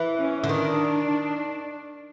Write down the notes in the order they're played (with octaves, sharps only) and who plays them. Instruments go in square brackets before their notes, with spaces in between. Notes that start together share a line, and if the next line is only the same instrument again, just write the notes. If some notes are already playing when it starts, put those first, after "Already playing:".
Already playing: [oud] E3
[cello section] C#4
[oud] D3
[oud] D#3 [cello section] D4